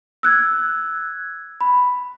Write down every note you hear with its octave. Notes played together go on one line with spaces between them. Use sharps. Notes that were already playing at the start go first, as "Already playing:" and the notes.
E6 F#6 G#6
B5